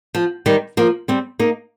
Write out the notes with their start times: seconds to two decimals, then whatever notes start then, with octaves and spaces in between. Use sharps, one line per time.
0.15 F3
0.46 D#3 G3
0.77 F3 A#3
1.08 G3 C4
1.39 A#3 D#4